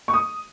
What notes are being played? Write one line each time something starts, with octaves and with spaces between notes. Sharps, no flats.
C#6
D#6